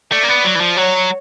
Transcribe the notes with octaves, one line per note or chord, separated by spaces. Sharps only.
A3 D5
A#3
B3
F#3
E3
F3
F#3 C#5